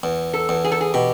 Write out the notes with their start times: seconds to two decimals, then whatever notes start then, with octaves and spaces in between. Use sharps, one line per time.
0.03 E2
0.34 A4
0.49 E2
0.64 G#4
0.72 A4
0.81 G#4
0.94 B2 G4